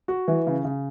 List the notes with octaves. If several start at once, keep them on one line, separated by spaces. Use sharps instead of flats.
F#4
E3
C#3
C#3